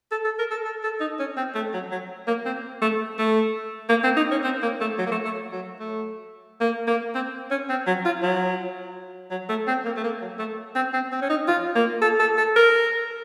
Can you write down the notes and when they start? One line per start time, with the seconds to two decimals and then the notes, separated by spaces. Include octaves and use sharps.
0.11 A4
0.25 A4
0.39 A#4
0.51 A4
0.65 A4
0.83 A4
1.01 D#4
1.19 C#4
1.37 C4
1.55 A3
1.73 F#3
1.92 F#3
2.27 A#3
2.45 C4
2.82 A3
3.18 A3
3.89 A#3
4.04 C4
4.17 D#4
4.31 C#4
4.44 C4
4.62 A#3
4.81 A3
4.98 F#3
5.06 A#3
5.11 A3
5.25 A3
5.52 F#3
5.80 A3
6.61 A#3
6.88 A#3
7.15 C4
7.51 C#4
7.69 C4
7.87 F#3
8.05 F4
8.23 F#3
9.31 F#3
9.49 A3
9.68 C4
9.85 A#3
9.96 A3
10.04 A#3
10.21 F#3
10.39 A3
10.75 C4
10.93 C4
11.12 C4
11.22 C#4
11.30 D#4
11.48 F4
11.75 A#3
12.02 A4
12.20 A4
12.37 A4
12.56 A#4